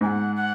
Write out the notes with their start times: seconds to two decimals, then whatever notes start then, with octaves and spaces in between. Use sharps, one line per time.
0.01 G#2 G#5
0.06 F#5
0.35 F#5